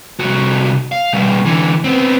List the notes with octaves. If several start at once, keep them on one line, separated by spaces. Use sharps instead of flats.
C2 F#4
F5
B2 G3
D3 E3
B3 C4